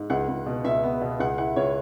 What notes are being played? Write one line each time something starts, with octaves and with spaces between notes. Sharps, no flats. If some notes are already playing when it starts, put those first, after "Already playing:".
Already playing: G#2
C#2 F#5
C#2
B2
C#2 E5
B3
B2
C#2 F#5
E4 F#5
C#2 C#5